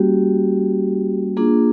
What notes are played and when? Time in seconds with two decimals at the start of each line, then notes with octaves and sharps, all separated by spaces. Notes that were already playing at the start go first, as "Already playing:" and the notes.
Already playing: G3 A#3 C#4 F#4 G4
1.37 A#3 D4 F4 G#4